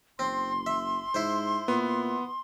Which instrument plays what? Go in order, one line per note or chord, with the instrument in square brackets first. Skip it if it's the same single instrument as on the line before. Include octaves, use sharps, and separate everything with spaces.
[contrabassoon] F#1 [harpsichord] C4 [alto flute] C6
[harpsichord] E5
[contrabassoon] G#2 [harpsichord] E4 C5
[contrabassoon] A#2 [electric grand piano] B3